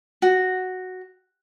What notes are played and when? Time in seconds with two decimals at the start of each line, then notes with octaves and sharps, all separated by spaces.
0.22 F#4